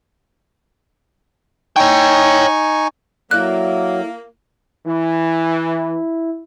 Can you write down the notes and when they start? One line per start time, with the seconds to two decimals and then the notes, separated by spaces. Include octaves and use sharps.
1.76 D#4 C#5 G5 G#5 C#6
3.31 F#3 A#3 E4 A4 D5 F#6
4.86 E3 E4